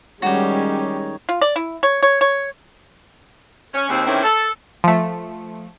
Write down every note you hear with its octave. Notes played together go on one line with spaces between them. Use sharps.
D#3 G3 G#3 C#4 D#4 F#4 G4 C#5
F4
D5
E4
C#5
C#5
C#5
C#4
D#2 G#3 C4
C3 D#3 E3 A3 C4 C#4
A4
F3 A3